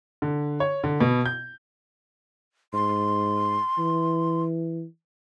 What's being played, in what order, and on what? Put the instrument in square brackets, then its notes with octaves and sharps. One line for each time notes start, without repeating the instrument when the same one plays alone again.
[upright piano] D3
C#5
D3
B2
G6
[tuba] G#2 [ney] C6
[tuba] E3